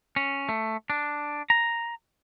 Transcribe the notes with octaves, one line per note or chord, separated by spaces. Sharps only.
C#4
A3
D4
A#5